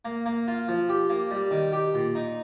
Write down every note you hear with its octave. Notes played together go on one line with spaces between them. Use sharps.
A#3
A#3
F4
F3
G4
A#3
G3
D#3
G4
A#2
D#4